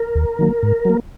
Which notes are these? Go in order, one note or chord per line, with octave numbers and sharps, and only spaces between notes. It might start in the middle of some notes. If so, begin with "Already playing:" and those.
Already playing: A#4
D#2
D#3 F#3 A#3
G#2
F#3 A#3